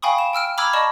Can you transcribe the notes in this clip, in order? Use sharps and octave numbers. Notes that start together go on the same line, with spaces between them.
F5 G5 G#5 B5 C#6 D#6
E7
G5 E6 F6 D7
A#5 B5 D6 E6 F6 G#6
D5 D#5 A5 B5 C#6